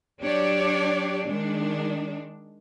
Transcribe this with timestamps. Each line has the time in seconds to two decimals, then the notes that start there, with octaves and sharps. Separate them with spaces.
0.21 F#3 D4 G4 C#5 D5
1.27 D#3 G#3 D4